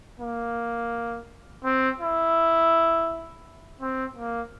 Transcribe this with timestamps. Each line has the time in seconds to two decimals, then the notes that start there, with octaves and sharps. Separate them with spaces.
0.20 A#3
1.64 C4
2.00 E4
3.80 C4
4.16 A#3